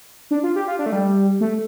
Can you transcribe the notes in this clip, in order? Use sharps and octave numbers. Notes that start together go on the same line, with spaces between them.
D4
F4
G4
F4
D4
A3
G3
A3